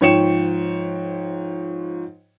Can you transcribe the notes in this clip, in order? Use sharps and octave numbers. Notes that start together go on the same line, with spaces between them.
G#2 F3 C#5 G5 C#7 E7